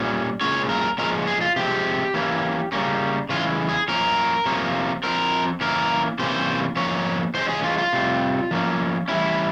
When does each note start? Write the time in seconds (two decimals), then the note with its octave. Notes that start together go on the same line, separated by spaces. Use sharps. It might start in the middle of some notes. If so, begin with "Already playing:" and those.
Already playing: A#2 G3 C#4
0.41 A#2 G#3 C#4 C#5
0.69 A#4
0.98 A#2 F3 G#3 C#4 A#4
1.27 G#4
1.41 F4
1.56 C3 F3 G#3 C4 G4
2.14 E3 A#3 C#4
2.72 C#3 G3 A#3 C#4
3.29 C#3 E3 G#3 C#4 F4
3.69 G#4
3.88 F3 A#3 C#4 A#4
4.46 C3 F3 A#3 C#4
5.03 F3 C4 A#4
5.61 E3 A#3 C#4 A#4
6.19 C3 E3 A#3 C#4 C5
6.76 F3 A#3 C#4 C#5
7.34 E3 G#3 C#4 C5
7.49 G#4
7.64 F4
7.78 F4
7.93 C3 G3 C4
8.51 F3 A#3 C#4
9.08 E3 G3 C#4 E4